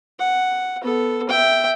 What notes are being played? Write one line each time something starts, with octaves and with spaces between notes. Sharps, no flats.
F#5
B3 A4
E5 G5